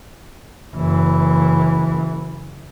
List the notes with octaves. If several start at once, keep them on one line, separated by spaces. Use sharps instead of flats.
F#1 E3